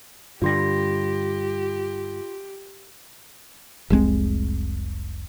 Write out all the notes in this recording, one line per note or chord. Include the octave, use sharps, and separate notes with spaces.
G2 D3 G3 F4 G4 C6 A#6
F1 C2 G#3 C4